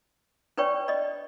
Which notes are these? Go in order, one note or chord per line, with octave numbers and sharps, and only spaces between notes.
D4 B4 C#5 D5 G5 C#6
D5 D#5